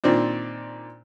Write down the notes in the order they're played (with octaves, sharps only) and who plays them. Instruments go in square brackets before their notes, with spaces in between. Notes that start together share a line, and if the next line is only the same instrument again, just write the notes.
[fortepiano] A#2 D#3 C4 D4